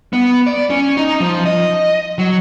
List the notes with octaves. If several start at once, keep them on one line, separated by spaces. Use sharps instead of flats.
B3
D5
C#4
D#4
F3
D#5
F#3